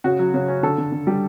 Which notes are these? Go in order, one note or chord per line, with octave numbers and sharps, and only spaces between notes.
C#3 F#4
F#3
C#3
C#4
D3 A4
D3
D3
G3